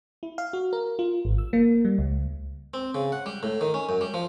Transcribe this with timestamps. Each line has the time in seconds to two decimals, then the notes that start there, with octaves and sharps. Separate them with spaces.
0.23 E4
0.38 F5
0.53 F#4
0.73 A#4
0.99 F4
1.25 G#1
1.38 E6
1.53 A#3
1.85 G3
1.98 C#2
2.74 C4
2.95 C#3
3.12 F#5
3.26 G3
3.43 A2
3.61 D#3
3.74 C#4
3.89 F#2
4.01 G3
4.14 F3